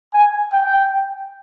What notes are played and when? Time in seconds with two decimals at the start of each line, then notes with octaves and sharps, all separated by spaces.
0.14 G#5
0.52 G5